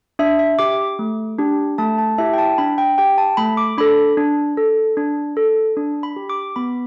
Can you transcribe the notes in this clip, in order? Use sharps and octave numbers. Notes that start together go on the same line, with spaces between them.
D4 E5
E5
G4 D6
A3
D4 G4
A3 A5
A5
E4 G4 E5
G5
A5
D4 B5
G5
G4 G5
A5
A3 B5
D6
D4 A4 B5
D4
A4
D4
A4
D4
B5
G4
D6
B3 B5